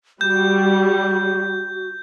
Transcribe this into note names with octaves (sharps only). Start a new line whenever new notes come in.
G3 F#4 G6